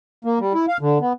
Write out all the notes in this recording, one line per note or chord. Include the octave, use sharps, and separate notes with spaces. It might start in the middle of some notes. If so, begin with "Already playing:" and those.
A#3
G3
E4
F5
D3
B3